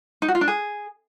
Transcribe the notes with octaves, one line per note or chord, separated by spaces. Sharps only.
D#4
F#4
F4
D4
G#4